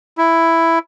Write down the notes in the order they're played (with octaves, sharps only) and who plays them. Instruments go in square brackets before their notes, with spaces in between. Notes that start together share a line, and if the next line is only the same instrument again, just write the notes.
[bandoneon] E4